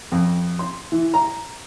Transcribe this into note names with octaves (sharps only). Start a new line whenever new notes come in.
F2
C6
E3
A#5